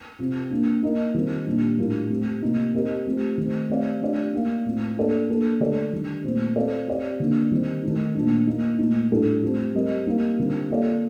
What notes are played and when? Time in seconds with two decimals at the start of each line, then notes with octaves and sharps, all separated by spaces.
0.19 C3 F3 C4 F4
0.51 F3 A#3 D4
0.82 A#3 D#4 A#4 D#5
1.14 D#3 G3 C4 F4 A#4
1.46 A#2 G3 D4
1.78 A2 G3 D4 F4 A#4
2.10 A3 C4 G4
2.42 C3 F3 A#3 D#4 G4
2.74 C4 G4 A#4 D#5
3.06 F3 A3 C4 G4
3.38 D#3 A3 C4
3.69 A3 C4 G4 D5 F5
4.01 F3 A3 D4 G4 D5
4.33 A#3 D#4 A#4 F5
4.65 A2 A3 C4 F4
4.97 A#3 D4 F4 A4 D5
5.28 F3 A#3 D4 A4
5.60 D3 A3 D4 A4 D5
5.92 D#3 G3 D4
6.24 A#2 A3 C4 F4 C5
6.56 C4 F4 A4 D5 F5
6.88 C4 G4 D5
7.20 D3 F3 A#3 D#4
7.51 D#3 G3 C4
7.83 D#3 A3 D#4
8.15 A#2 F3 A3 D4
8.47 F3 A#3 D#4
8.79 A#2 F3 A3 D#4
9.10 A2 G3 D4 F4 A4
9.43 F3 A3 C4 G4
9.74 G3 C4 G4 A#4 D#5
10.07 G3 A#3 D#4 A#4 F5
10.38 D3 G3 C4 F4 A#4
10.70 A#3 F4 A4 D5 F5